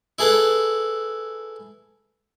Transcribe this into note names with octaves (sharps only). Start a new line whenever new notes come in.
E4 G#4 A4 B4